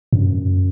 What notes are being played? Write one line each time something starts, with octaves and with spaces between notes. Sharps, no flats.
F#2